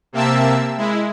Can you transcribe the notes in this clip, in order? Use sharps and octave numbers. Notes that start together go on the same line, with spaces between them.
C3 A#3 C4 E5 A5 E6
G#3 E4